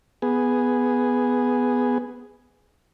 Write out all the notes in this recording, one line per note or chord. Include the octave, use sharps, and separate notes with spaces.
B3 G#4